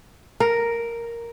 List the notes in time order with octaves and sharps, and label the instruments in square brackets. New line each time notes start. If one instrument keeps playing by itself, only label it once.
[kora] A#4